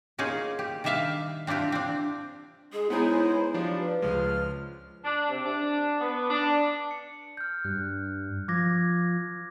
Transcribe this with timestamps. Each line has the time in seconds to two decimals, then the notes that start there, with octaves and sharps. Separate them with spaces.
0.18 A#3 C#4 D#4 F4 G#4
0.59 G4
0.84 D#3 G3 D4 E5 F5 A5
1.47 C4 D4 E4 F4 G4
1.72 C4 D4
2.73 G#3 G#4 D#5
2.90 G#3 B3 D#4 E4 G#4 C5 C#5
3.54 F3 D4 G4 D5
3.79 B4
4.02 C#2 F3 G#3 F4 F6
5.04 D4
5.29 C3
5.44 D4
6.00 B3
6.30 D4
6.91 C#7
7.37 F6 G6
7.64 G2 F#6
8.48 F3 D6 G#6 A#6